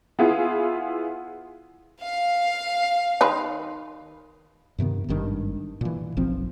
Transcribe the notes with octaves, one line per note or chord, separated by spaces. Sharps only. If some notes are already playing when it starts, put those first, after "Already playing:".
B3 E4 F4 G#4
F5
D#3 B4
G2 C3 D#3 B3
G#1 G2 D#3 D4
A#2 E3
F#1 B1 F3 C4